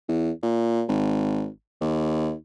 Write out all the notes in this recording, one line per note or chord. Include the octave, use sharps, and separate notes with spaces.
E2
A#2
G#1
D#2